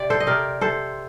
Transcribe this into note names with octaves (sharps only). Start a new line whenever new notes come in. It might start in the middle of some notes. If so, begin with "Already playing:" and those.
Already playing: C3 D5
A4 C5
D#5
C3 A#4 D5
C3 A4 C5